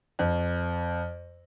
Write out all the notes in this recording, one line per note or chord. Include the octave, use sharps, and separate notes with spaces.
F2